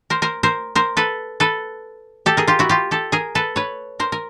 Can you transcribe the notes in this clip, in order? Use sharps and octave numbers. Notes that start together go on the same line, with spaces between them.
A#4 C5
A#4 C5
A#4 C5
A#4 C5
A4 B4
A4 B4
G4 A4
G#4 A#4
F4 G4
E4 F#4
F4 G4
G4 A4
G#4 A#4
A4 B4
B4 C#5
A#4 C5
A#4